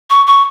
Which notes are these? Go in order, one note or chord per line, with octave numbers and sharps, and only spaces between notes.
C#6
C#6